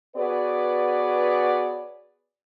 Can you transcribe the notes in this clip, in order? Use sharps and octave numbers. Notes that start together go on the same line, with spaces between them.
B3 F#4 G#4 B4 C#5 D5